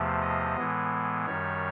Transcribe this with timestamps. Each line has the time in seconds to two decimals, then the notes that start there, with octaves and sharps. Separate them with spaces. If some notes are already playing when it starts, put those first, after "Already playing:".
Already playing: E2 C3 F3 A3
0.21 D#5
0.56 A2 E3 G#3 B3
1.26 F#2 D#3 G3 C#5